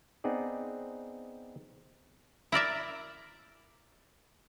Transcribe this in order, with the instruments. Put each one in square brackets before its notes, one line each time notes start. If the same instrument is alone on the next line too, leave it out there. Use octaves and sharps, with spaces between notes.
[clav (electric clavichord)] B3 C4 D#4 G#4 D5
[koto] E4 A#4 D5 E5